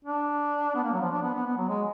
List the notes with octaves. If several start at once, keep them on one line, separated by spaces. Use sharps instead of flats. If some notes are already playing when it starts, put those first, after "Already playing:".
D4
B3
A#3
F#3
F3
D4
B3
B3
B3
F#3
G#3